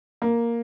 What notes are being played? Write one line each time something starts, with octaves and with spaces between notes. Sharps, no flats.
A#3